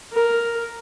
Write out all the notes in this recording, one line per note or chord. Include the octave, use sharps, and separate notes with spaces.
A#4